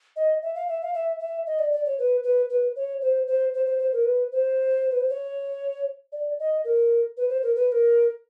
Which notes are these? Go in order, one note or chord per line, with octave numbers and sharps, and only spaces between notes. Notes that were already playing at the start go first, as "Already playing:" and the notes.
D#5
E5
F5
E5
F5
E5
E5
D#5
D5
D5
C#5
B4
B4
B4
C#5
C5
C5
C5
C5
C5
A#4
B4
C5
B4
C5
C#5
D5
D#5
A#4
B4
C5
A#4
B4
B4
A#4